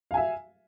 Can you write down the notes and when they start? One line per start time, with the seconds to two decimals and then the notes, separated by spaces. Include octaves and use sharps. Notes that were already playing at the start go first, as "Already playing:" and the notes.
0.11 F5
0.14 G#5
0.17 E5